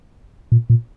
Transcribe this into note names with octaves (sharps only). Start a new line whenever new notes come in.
A#2
A#2